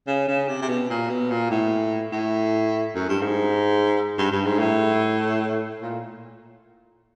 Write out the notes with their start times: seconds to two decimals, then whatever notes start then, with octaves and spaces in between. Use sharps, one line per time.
0.07 C#3
0.28 C#3
0.48 C3
0.62 C3
0.69 B2
0.90 A#2
1.09 B2
1.30 A#2
1.51 A2
2.12 A2
2.95 F#2
3.09 G2
3.21 G#2
4.18 G2
4.31 G2
4.45 G#2
4.59 A2
5.82 A#2